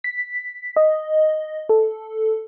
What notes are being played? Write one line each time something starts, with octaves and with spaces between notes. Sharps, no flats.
B6
D#5
A4